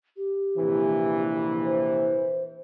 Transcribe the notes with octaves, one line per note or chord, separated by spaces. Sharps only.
G4
A#1 C3 E3
C5